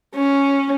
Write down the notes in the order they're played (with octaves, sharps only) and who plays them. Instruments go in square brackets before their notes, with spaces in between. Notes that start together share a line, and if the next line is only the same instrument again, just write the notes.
[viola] C#4